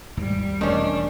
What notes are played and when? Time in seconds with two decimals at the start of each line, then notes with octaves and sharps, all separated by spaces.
0.17 D#2 G#2 G3
0.61 E1 D#3 A3 C#4 D4